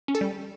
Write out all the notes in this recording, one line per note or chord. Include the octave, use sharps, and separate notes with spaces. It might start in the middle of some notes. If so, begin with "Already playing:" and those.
C#4
A4
G3